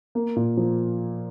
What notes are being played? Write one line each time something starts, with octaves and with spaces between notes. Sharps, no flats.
A#3
A#2
F3